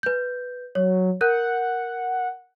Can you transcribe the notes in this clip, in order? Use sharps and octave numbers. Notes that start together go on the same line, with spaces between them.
B4 G6
F#3 C#5
A#4 F#5 F#6 G6